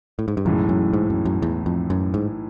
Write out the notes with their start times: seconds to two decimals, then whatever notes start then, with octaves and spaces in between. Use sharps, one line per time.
0.19 A2
0.28 G#2
0.37 G2
0.45 B1 F#2 A2 E3 G#3
0.69 F#2
0.93 G#2
1.10 F#2
1.25 F#2
1.42 E2
1.66 F2
1.90 F#2
2.14 G#2